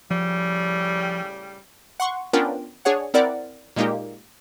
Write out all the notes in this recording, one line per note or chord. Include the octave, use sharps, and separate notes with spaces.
A2 C#3 F3 G3
F#5 C6 C#6
B3 C#4 D4 F4 A#4 G5
D4 G#4 C#5 F#5
C4 E4 A#4 D5 F#5
A#2 G#3 A#3 D#4 G4